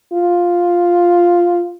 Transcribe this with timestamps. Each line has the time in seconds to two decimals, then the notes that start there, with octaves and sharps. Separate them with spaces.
0.14 F4